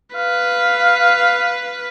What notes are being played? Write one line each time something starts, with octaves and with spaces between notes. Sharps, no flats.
B4 F5